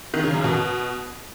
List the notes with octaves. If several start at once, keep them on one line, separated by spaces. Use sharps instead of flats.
D#3
C#3
F#2
B2